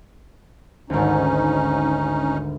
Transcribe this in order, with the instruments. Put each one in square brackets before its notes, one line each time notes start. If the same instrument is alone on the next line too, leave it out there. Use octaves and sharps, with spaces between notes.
[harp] G#1 D2 [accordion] C#4 D#4